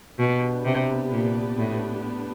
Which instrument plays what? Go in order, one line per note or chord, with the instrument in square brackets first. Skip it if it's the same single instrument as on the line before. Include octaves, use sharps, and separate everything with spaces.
[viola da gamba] B2 [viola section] B3 D4 G4 B4
[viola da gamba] C3
A#2
A2